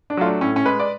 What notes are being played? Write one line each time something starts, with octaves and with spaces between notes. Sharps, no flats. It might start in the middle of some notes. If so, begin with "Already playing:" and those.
D4
F#3 A3 F4
D4
A2 C#4
C#4
G#3 B4
D5